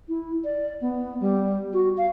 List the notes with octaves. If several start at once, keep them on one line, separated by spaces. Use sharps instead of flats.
E4
D5
B3
G3
F#4
F5